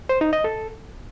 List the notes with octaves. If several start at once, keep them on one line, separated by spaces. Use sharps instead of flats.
C5
D#4
D#5
A4